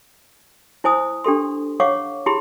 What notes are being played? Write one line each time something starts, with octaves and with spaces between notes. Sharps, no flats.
E4 C5 G#5 D#6
D4 G4 A4 C6
C#5 F5 F#5 C#6 D6
E4 G4 G#4 B5 C6